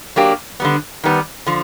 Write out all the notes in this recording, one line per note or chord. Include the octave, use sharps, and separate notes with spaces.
F#3 A#3 D4 G4
D3 G3 B3
D#3 G3 B3
D3 F3